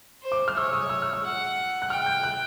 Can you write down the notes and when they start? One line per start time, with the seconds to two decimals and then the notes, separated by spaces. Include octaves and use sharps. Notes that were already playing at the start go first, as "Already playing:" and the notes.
0.22 C5
0.32 D6
0.48 F6
0.57 C#5 E6
0.73 D#6
0.89 E6
1.02 F6
1.13 E6
1.23 F#5
1.82 F#6
1.90 G5 F6
2.06 G6
2.23 F#6